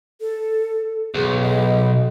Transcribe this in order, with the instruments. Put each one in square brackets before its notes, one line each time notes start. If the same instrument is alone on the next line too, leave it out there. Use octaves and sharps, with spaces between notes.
[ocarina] A4
[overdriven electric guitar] B1 [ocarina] G#4
[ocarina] D#5